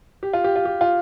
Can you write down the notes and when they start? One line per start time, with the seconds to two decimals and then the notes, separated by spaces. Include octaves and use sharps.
0.23 G4
0.33 F4
0.44 G4
0.56 F4
0.65 G4
0.81 F4